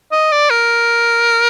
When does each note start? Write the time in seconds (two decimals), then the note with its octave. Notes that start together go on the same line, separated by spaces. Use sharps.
0.12 D#5
0.32 D5
0.50 A#4